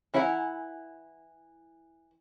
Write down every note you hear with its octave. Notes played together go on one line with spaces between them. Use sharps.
E3 E4 F#5 G#5 A#5